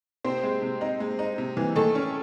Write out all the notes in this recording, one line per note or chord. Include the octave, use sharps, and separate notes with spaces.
C3 C4 C5
G#3
C3
D#4
G#3
D#4
C3
E3
D#3 A3 A4
C#4